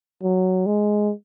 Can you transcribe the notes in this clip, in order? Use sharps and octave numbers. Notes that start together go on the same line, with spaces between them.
F#3
G#3